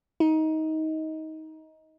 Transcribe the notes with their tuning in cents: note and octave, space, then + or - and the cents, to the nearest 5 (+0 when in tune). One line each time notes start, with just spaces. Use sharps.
D#4 +20